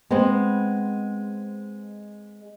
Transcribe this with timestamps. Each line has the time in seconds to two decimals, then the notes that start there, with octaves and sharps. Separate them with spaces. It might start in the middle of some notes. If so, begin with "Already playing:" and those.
0.11 G#3 B3 C4 C5